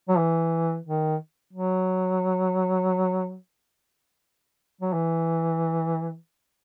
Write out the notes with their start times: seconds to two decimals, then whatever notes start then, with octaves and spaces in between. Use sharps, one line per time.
0.09 F#3
0.18 E3
0.85 D#3
1.53 F#3
4.81 F#3
4.93 E3